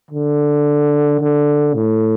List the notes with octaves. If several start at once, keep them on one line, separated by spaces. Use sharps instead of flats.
D3
D3
A2